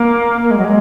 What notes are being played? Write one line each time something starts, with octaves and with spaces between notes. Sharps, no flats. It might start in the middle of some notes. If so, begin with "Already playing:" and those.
Already playing: A#3
A#3
G#3
F#3
G#3